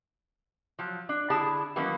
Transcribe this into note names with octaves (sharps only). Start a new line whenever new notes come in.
F3 F#3
D4
D3 E4 G#4 A5
D#3 E3 F#3 A#3 B3 C#4